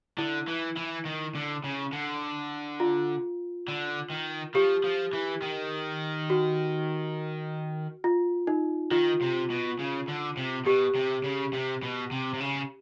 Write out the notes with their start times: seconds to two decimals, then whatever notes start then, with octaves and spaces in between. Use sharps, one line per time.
0.18 D3 E4
0.47 E3
0.77 E3
1.05 D#3
1.35 D3
1.64 C#3
1.93 D3
2.80 F4
3.68 D3
4.11 D#3
4.55 F3 G4
4.84 F3
5.13 E3
5.42 D#3
6.30 F#4
8.04 F4
8.47 D#4
8.91 D#3 F4
9.21 C3
9.50 B2
9.79 C#3
10.08 D3
10.37 C3
10.66 B2 G4
10.96 C3
11.24 C#3
11.54 C3
11.83 B2
12.11 C3
12.34 C3
12.40 C#3